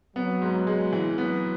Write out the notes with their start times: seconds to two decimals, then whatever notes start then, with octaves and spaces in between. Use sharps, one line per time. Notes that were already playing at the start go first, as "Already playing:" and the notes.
0.16 F#3 B3
0.42 G#2
0.67 G#3
0.93 E3
1.18 F#3 B3